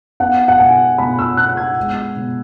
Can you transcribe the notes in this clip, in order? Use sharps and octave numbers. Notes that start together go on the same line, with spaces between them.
B3 F#5
F#5
B2 G#5
B2 B5
E6
B3 F#6
G#6
G#3
B2